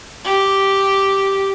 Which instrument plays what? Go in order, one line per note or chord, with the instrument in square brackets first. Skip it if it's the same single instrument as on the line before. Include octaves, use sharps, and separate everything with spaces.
[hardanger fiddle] G4